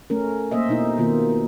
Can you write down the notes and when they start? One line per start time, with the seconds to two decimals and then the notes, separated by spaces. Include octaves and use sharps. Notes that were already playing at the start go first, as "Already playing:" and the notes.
0.10 A3 C#4 A#4
0.51 A#3 C5 D#5 E5
0.69 B2 D#4 E4
0.98 B2 D#3 A#3 F4